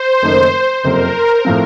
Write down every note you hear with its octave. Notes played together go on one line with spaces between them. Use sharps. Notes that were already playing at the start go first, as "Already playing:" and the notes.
Already playing: C5
F#1 F#2 D#3 A3 D#4
F#1 F2 C3 A#4
A2 F3 C4